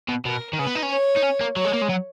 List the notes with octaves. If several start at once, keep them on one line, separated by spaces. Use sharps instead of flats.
B2
B2 A#4
D#3
C#3 B4
B3
D#4
C#4
C#5
D#4
C#4
A#3
F#3 C#5
G#3
A#3
G#3
F#3